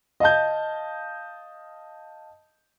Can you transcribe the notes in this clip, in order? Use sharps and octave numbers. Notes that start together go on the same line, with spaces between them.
D#5 F5 A5 G6